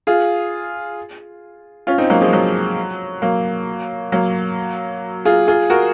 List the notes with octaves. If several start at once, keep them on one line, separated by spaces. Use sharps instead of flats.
F4 G#4
C#4 F4
C4 D#4
F#3 A#3
F3 G#3
F#3
F#3 A#3
F#3 A#3
F4 G#4
F4 G#4
F#4 A#4